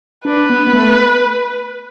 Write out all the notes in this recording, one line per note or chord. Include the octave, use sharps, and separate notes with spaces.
D4 B4
B3
B3
A3